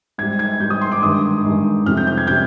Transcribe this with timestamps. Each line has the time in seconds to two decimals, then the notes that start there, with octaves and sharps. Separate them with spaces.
0.18 G#2 G3 G#6
0.39 G#6
0.60 G#2 G3 G6
0.70 D#6
0.81 C6
0.92 D6
1.02 G2 D#3 G#3 D#6
1.44 G2 D#3 G#3
1.86 F2 C3 G3 F6
1.97 G6
2.07 G6
2.18 G#6
2.27 C3 G3 G6